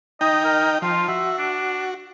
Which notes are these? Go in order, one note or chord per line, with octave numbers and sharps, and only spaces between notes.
D#4 D#5 G5
A#4
F3 F4
F#4 E5
D4